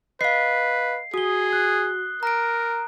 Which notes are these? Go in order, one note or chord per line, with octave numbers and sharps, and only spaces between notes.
B4 D#5 F5 C7
F#4 G#4 D#6 G7
F#6
A#4 A#5 D7